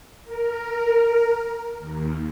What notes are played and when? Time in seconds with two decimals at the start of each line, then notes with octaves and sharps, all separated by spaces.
0.25 A#4
1.79 D#2